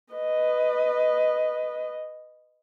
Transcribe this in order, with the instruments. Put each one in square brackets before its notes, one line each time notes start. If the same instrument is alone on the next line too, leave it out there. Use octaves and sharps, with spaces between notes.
[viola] B4 D#5